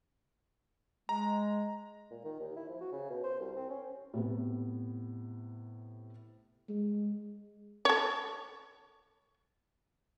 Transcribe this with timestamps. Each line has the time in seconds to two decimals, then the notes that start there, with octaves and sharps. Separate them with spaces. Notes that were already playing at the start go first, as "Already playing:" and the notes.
1.09 G#3 A#5
2.11 A#2
2.24 D#3
2.40 D#2
2.56 E4
2.69 F3
2.81 F#4
2.92 C#3
3.10 B2
3.24 C5
3.40 C2
3.56 C4
3.70 C#4
4.14 A2 C3 B3
6.69 G#3
7.85 A4 C#5